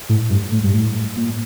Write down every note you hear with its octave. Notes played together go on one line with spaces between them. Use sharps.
A2
G2
A2
G2
A2
A#2